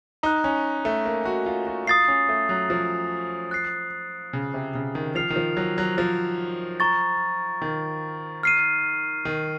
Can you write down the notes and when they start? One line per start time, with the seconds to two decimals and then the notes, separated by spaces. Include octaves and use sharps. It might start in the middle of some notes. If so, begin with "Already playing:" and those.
0.23 D#4 A#5 D#6 F#6
0.44 C#4
0.85 A3
1.05 A#3
1.25 F#4
1.46 F4
1.67 F#4
1.87 F4 D#6 A6 C7
2.08 C#4
2.29 A3
2.49 F#3
2.70 F3
3.51 F#6 A6 C7
4.33 C#3
4.54 C3
4.75 C#3
4.95 D#3
5.15 F3 F6 C7 F7
5.30 D#3
5.36 F3
5.57 F#3
5.78 F#3
5.98 F3
6.80 A#5 C#6 A6
7.62 D#3
8.43 F6 C7 D#7
9.25 D#3